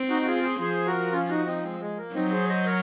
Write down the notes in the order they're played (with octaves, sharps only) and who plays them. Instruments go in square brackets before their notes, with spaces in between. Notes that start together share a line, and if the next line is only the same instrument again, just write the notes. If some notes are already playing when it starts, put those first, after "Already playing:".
Already playing: [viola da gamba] C4
[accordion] D#4 F#4
F#4
F4 G#4
G#4 C5
[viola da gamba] F3 [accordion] G#4 C5
[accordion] F#4 A#4
C#4 F4
D#4 F#4
C4 D#4
G#3 C4
G#3
A#3
[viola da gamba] F#3 [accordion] C4 D#4
[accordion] G#4 C5
C5 D#5
A#4 C#5